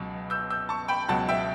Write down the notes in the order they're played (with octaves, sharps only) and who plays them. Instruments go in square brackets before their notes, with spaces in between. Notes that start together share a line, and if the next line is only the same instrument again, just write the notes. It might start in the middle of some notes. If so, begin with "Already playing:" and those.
Already playing: [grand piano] C#2 B2 F#3
E6 G6
E6 G6
A5 C#6
G5 B5
C#2 B2 F#3 F#5 A5
E5 G5